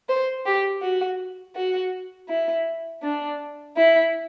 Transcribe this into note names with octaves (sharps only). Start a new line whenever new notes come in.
C5
G4
F#4
F#4
E4
D4
E4